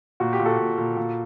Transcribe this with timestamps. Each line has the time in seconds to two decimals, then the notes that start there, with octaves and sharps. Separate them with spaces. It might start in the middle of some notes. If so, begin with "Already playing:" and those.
0.20 A#2 F#4
0.33 G4
0.39 A#2
0.46 F#4 A4
0.59 A#2
0.78 A#2
0.97 A#2